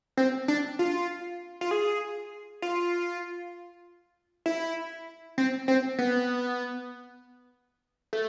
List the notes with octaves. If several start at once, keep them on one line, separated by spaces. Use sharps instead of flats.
C4
D4
F4
F4
G#4
F4
E4
C4
C4
B3
A3